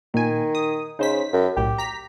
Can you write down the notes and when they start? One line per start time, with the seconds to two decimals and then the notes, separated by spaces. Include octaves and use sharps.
0.14 A#2 D#3 G#5
0.55 D#6
0.99 C#3 D#4 C5 B6
1.33 F#2
1.57 B1 A2 G4
1.78 A#5 B6